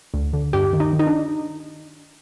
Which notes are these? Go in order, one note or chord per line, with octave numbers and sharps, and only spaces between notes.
D2
D3
G2 G4
D#3
D#4
D#3
D#4
D4